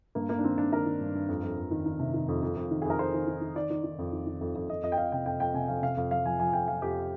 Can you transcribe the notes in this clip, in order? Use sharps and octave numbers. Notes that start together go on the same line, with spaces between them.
G2 A#3
G2 A#3
D4
D#3 C4
G2 D4
D#3 A#4
D#3
G2
G2
F2
F2
F2
D#3
D#3
C3
D#3
F2
F2
F2
D#3
F2 G#4
A#4
F2 C5
D#3
D#3
D#3
D#3 D5
D#3
D#3
F2
D#3
D#3
F2
F2
F2 D#5
F2 D#5
G5
F2 F5
C3 G5
F2 G5
F2 G5
C3 G#5
F2 F5
C3 F5
F2 F5
F3 F5
F3 G#5
F3 G#5
F2 G5
F3 F5
F2 G4